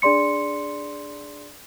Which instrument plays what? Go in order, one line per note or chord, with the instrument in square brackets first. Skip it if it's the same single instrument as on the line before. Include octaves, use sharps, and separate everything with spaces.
[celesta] D4 G#4 D5 C6 C#7